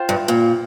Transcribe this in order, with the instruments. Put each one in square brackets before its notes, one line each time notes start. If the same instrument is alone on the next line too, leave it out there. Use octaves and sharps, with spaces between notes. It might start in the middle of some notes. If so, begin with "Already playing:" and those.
Already playing: [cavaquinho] F4 C5 G5
[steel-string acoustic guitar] G2
A#2